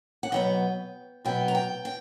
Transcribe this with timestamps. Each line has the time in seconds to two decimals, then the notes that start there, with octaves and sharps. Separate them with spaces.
0.23 F#5
0.32 B2 F#3 B3 G5
1.25 B2 F#3 B3 G5
1.48 A#5
1.55 G5
1.85 G5